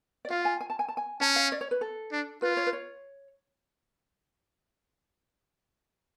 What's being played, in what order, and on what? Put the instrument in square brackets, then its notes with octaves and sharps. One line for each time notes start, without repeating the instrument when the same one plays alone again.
[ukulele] D5
[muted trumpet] F4 [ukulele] F5
[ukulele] G#5
G#5
A5
G#5
A5
G#5
[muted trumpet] C#4 [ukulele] A5
[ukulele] F5
D5
C#5
B4
A4
[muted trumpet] D4
[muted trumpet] F4 [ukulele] B4
[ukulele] C#5
B4
C#5